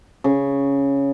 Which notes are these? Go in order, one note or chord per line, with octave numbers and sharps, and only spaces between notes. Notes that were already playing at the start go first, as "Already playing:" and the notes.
C#3